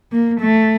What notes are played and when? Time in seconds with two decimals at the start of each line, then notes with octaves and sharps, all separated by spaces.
0.12 A#3
0.41 A3